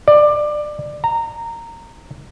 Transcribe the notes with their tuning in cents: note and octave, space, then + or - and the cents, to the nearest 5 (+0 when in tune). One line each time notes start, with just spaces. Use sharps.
D5 +20
A#5 -15